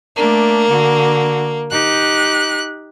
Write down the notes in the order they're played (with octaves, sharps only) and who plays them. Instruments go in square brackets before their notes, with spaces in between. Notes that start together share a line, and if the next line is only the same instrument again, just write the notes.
[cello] A3 D4 [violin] A#3
[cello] D3 F#4
[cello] D#4 G4 [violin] F#6